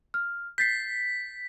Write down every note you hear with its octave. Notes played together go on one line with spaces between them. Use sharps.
F6
G6 A6 B6 C7